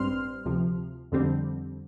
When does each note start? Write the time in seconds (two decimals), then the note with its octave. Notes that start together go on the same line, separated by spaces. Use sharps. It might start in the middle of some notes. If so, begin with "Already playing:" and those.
Already playing: A1 G2 G3 C4 C6 F6
0.45 D2 C3 F3
1.12 F2 D3 G3 C4